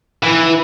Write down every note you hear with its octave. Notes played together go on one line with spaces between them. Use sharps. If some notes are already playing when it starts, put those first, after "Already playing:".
E3